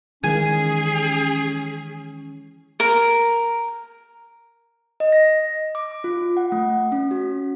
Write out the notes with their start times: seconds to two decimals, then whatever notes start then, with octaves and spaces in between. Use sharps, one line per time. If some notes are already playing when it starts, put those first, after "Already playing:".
0.24 D#3 E3 G#3 C#4 G#4 G#5
2.80 A#4
5.00 D#5
5.12 A#6
5.75 D6
6.04 F4
6.37 F#5
6.52 A3
6.92 C#4
7.11 F#4